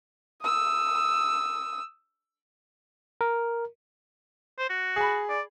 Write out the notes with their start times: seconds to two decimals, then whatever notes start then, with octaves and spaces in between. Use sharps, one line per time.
0.42 D#6 E6
3.21 A#4
4.59 C5
4.70 F#4
4.96 G#4 B5
5.30 D5